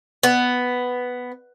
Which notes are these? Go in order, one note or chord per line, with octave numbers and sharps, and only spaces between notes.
B3